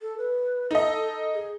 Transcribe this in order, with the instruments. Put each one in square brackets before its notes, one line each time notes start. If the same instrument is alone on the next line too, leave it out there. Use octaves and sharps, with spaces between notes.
[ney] A4
B4
[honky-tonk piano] D#4 D#5 [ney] A4
[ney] G#4